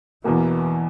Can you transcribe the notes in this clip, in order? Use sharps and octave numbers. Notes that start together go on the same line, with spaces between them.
E2 B2 E3 A#3